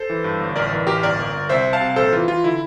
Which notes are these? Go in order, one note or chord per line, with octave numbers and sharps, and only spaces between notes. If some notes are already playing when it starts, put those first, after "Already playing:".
Already playing: A4 C5
E3
G2
G1
A1 A#4 D5
E3
A1 G4 A#4
G1 A#4 D5
G1
G1
C2 C5 E5
C2
F5 A5
C3
A#1 A4 C5
E3 F4
E3 F4
D3 E4